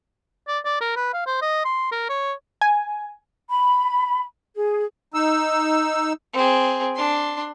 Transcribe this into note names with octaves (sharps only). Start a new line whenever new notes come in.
D5
D5
A#4
B4
F5
C5
D#5
C6
A#4
C#5
G#5
B5
G#4
D#4 E6
C4 G#4
D4 C6